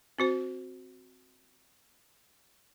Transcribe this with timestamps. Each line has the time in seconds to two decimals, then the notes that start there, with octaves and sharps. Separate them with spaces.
0.19 C4 F#4 C5